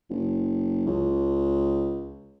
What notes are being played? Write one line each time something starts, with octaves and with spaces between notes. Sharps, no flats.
F#1
C#2